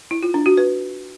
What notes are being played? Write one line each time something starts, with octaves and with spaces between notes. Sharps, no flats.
E4
F4
D4
F#4
B4